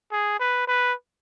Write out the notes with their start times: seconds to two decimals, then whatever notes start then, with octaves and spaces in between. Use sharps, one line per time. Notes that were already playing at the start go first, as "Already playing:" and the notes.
0.12 G#4
0.40 B4
0.68 B4